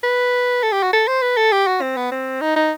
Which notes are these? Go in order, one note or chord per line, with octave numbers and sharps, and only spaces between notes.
B4
A4
G4
F#4
A4
C5
B4
A4
G4
F#4
C4
B3
C4
D#4
D#4